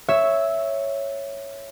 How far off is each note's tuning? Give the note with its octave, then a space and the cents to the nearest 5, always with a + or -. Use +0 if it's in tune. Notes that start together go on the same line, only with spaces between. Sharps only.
C#5 +0 E5 +5 E6 -10